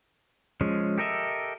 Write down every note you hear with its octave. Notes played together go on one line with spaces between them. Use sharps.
F3 G#3 C#4
G4 A4 A#4 D#5 E5